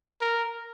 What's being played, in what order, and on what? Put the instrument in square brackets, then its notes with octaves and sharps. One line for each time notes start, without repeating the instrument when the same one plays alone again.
[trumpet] A#4